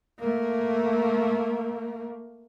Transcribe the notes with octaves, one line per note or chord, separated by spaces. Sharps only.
A3 A#3